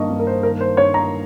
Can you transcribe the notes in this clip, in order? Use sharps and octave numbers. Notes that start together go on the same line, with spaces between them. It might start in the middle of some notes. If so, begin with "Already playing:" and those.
Already playing: G2 D#3 A#3 D#5 C#6
G2
A#4
C5
D#3 A#4
C5
G2 C#5
A#5